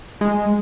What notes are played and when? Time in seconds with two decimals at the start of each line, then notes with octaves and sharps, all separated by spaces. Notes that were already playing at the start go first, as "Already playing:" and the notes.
0.21 G#3